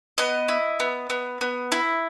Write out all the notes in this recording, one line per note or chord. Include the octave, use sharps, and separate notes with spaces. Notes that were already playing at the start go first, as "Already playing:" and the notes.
B3 D#5
E4
B3
B3
B3
E4